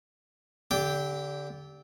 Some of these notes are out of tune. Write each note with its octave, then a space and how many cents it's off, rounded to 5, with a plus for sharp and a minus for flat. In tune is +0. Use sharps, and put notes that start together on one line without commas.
D3 -25 G4 +0 G5 +0